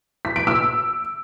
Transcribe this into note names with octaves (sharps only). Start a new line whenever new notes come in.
B6
D7
E6